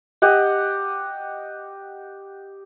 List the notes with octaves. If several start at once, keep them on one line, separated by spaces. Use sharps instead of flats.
G4 D#5 F#5